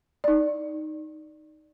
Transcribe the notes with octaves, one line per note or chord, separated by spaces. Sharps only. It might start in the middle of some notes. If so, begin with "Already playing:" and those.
D#4 D5